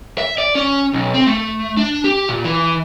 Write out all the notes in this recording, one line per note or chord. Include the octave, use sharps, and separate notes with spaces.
E5
D5
C#4
B1
C4
A3
D4
G4
A#2
E3